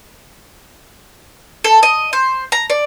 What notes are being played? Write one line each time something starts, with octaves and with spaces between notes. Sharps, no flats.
A4
D#5
C5
A#5
D5